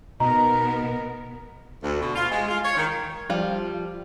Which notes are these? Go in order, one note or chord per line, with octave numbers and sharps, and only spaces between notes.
B2 B3 D#4 A#4 A#5
D2
B2
F4
G#3
F4
C#5
D#3
F3 G3 F4